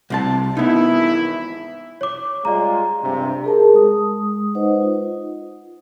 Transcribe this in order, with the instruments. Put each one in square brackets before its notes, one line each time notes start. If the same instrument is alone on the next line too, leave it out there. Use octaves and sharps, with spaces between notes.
[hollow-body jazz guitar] C2 C3 A5
[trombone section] G#1 E3 E4 [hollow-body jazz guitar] B3 D#4
[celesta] C#5 D6
[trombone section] G3 G#3 F4 [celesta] D5 A#5
[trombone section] G2 C3
[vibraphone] G#4 A#4 A5
G#3 D#6
D#4 B4 C5 D#5 F#5
F4